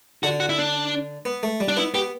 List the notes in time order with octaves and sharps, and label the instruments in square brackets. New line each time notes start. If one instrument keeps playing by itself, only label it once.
[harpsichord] D3 [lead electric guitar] F#4
[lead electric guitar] F#4
E4
D4
[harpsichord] B3
A3
G3
[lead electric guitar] D4
[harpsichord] B3 [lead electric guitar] E4
[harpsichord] B3 [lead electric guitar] G4